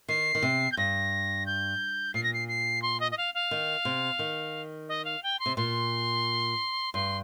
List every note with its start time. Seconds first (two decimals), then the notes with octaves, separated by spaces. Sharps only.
0.08 D#3 C7
0.35 D#3
0.42 C3
0.72 G6
0.77 G2 A#6
1.46 G6
2.14 A#2 C7
2.23 A#6
2.33 C7
2.48 C7
2.82 C6
3.00 D#5
3.11 D#5
3.17 F5
3.34 F5
3.51 D#3
3.85 C3
4.19 D#3
4.88 D#5
5.05 F5
5.23 G5
5.39 C6
5.46 C3
5.56 A#2 C6
6.94 G2 C6